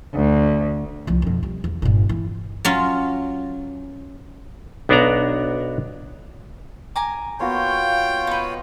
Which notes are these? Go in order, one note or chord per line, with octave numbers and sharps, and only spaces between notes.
D2
C2 F3
B1 F2
G3
E2
G1 A#2
E3
F#3 C#4 F4
B1 B3 D4 F#4 D5 A#5
G#5 A#5 D6
A#3 B3 F4 F#4 C#5 G5
D#4 B4